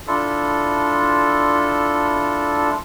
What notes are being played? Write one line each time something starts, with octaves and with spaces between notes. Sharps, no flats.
D4 E4 F4 A4